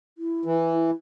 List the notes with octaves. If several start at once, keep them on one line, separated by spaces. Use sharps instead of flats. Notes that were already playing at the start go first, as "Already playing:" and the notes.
E4
E3
E4